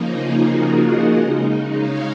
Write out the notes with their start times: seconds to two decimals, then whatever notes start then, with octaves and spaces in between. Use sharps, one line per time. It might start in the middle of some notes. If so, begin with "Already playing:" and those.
Already playing: C#3 F3 A#3 D#4
0.12 F4 G#4
0.45 F#4 A#4
0.79 D#5 F#5
1.13 C#3 G#3 D#4
1.79 C#5 F5